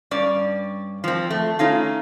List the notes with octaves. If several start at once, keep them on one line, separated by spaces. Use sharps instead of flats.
G2 C#4 D5
F3 C4
A3
A3 C#4 D#4 F4